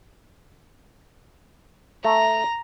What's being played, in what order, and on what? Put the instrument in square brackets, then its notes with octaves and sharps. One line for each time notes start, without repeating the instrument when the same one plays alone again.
[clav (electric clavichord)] A3 [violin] A#5